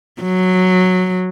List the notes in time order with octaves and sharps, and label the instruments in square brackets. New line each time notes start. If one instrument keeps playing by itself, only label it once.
[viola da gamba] F#3